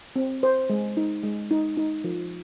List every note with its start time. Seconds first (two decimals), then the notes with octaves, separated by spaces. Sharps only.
0.16 C4
0.43 C5
0.70 G#3
0.97 D#4
1.23 G#3
1.51 D#4
1.77 D#4
2.04 F3